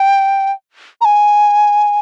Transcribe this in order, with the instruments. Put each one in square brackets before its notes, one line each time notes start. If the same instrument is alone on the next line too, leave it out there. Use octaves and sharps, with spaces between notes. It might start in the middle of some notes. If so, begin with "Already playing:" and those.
Already playing: [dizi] G5
A#5
G#5